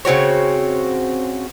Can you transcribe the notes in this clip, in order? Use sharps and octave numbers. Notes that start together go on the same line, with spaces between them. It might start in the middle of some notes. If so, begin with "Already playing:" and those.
C#3 C4 F#4 C#5